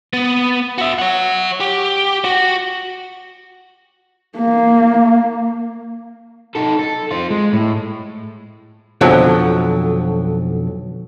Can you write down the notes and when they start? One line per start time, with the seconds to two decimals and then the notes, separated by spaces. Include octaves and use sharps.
0.13 B3
0.78 F#4 E5
0.99 C#5 F#5
1.60 G4
2.24 F#4
4.38 A#3
6.55 D#4 A4
6.79 A4
7.11 C4 F4
7.30 G#3
7.53 A2
9.01 B1 F2 D3 F3 F#3